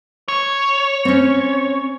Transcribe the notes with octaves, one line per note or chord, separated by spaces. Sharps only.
C#5
C4 C#4